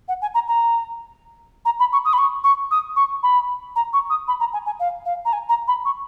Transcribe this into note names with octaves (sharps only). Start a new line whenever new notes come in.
F#5
G#5
A#5
A#5
A#5
B5
C#6
D#6
B5
C#6
C#6
D#6
C#6
B5
A#5
C#6
D#6
B5
A#5
G#5
G#5
F5
F5
A#5
G#5
A#5
B5
C#6